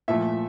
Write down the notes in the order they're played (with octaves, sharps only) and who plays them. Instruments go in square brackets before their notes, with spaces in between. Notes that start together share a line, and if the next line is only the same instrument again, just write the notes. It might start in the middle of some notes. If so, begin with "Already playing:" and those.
[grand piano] A#2 F3 A3 E5